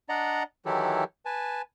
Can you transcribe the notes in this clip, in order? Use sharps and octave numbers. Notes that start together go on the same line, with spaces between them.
D4 D5 D#5 F#5 A#5
D#3 E3 F#3 E4 G4 A4
B4 G#5 A5